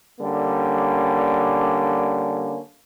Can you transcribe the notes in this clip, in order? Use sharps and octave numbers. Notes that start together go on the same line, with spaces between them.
D3 G3 A#3 C#4